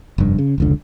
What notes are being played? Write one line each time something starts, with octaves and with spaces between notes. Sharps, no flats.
F1 G2
C#3
F1 C#2 D3